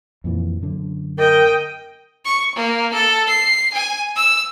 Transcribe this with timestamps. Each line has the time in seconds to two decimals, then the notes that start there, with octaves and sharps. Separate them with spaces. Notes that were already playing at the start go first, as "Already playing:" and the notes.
0.24 F2 A#2 E3
0.62 F#2 D3
1.19 A#4 D#5 G5
2.25 C#6
2.55 A#3
2.94 A4
3.29 C7
3.74 G#5
4.16 E6